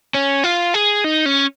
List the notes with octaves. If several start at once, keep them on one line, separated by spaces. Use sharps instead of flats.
C#4
F4
G#4
D#4
C#4